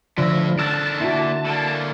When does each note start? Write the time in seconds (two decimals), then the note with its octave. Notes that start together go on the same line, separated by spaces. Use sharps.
0.18 A2 D3 F3 E5 A#6
0.59 D3 A#4 A5 E6 F#6 A6
1.00 A#2 E4 F#4
1.46 D3 A#3